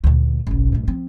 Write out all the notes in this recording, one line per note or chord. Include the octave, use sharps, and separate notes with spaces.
D2 A#2
F#1 B1
F#2 A2
F3 C4